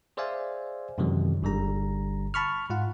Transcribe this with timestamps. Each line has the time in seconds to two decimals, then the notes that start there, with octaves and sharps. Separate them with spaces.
0.17 G#4 C5 D5 E5 F5 G#5
0.98 F#2 C3 D#3 E3 F#3 G#3
1.43 G1 D3 G3 A#5
2.34 A5 B5 C#6 F6
2.70 G#2 F4 F#5